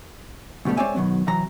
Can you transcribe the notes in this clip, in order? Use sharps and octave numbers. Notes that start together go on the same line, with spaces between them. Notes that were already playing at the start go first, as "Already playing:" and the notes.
D2 G#2 B2 G3 A3
G#3 C4 C#5 D5 E5 G#5
B2 D#3 F#3
C3 E3 F#3 A#5